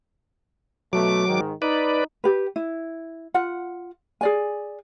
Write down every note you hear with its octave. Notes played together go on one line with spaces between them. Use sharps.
B2 F#3 A3 D6
G#2 D#3
D#4 B4 D5
G4 B4
E4
F4 F#5
G#4 D5 G#5